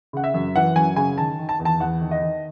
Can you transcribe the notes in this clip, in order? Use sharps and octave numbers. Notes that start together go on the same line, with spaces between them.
C#3 F#5
E5
F#2
E3 F#5
F#2 G#5
C#3 G#5
D#3 A5
D#3
A5
E2
A5
E2 F#5
D#3
D#5
D#3